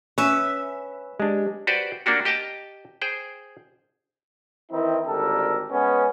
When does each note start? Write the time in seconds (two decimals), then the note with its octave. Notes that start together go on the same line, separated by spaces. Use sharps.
0.18 C#4 B4 C#5 E5
1.20 G#3 D4 G4
1.67 F#4 G4 B4 C5 D5
2.06 A#3 D4 F#4 G4
2.25 G4 D#5 G5 A5 A#5
3.02 G#4 C5 G5
4.71 D#3 E3 C4 D#4 E4
5.06 G#1 D3 G3 A4 A#4
5.71 G#3 B3 C#4